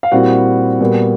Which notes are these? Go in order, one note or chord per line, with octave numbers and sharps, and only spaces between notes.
F5
A#2 G3 C4 E4 F#4 F#5
A#2 G3 B3